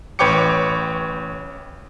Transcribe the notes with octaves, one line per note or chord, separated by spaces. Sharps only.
A1 B4 C#5 G5 D6 C#7